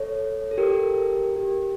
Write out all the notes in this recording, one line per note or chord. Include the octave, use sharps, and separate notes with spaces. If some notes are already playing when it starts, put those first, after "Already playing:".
Already playing: A4 C#5
A4
G4 A#4
G4